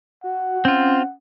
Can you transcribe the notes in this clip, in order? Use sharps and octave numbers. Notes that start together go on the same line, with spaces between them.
F#4 F#5
C4 C#4 F4